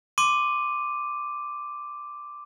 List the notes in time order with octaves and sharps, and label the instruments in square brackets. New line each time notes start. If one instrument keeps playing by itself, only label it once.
[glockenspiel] C6 D6 D#7